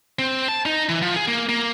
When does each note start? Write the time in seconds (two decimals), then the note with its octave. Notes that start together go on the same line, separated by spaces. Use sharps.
0.19 C4
0.48 A5
0.66 D#4
0.89 E3
1.02 F3
1.16 G#4
1.28 A#3
1.49 A#3